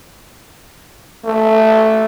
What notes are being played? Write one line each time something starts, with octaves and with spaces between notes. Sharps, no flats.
A3